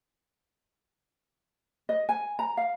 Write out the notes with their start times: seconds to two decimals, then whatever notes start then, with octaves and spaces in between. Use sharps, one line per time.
1.89 D#5
2.09 G#5
2.39 A#5
2.57 F5